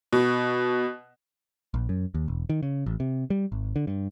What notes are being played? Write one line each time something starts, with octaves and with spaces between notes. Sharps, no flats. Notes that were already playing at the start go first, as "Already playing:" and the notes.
B2
A#1
F#2
D#2
E1
D#3
C#3
A1
C3
G3
G#1
D3
G2